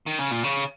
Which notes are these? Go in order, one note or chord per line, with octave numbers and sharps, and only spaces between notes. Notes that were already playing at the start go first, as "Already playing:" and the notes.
D#3
C#3
A#2
C#3